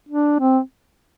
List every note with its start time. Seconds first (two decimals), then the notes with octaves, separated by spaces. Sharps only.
0.09 D4
0.40 C4